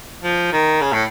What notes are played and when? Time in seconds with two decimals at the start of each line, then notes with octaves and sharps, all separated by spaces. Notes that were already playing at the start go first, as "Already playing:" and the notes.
0.23 F3
0.52 D#3
0.81 C#3
0.93 A2